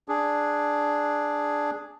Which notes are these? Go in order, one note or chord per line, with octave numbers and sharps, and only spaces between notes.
D4 G#4